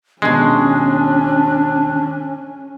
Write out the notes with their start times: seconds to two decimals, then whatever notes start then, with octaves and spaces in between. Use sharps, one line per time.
0.22 D#2 B2 G#3 C#4 D4